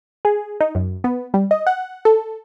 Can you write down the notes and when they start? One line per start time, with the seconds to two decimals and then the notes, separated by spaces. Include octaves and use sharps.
0.25 G#4
0.61 D#4
0.75 F#2
1.04 B3
1.34 G3
1.51 D#5
1.67 F#5
2.05 A4